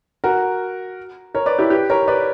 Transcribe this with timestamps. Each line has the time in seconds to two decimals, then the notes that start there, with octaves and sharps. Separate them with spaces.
0.24 F#4 A#4
1.34 A#4 C#5
1.46 B4 D5
1.59 E4 G4
1.70 G4 B4
1.90 A#4 C#5
2.08 B4 D5